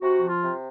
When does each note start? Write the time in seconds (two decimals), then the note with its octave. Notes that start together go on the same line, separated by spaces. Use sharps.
0.02 C3 F#4
0.22 F3
0.29 F4
0.42 C3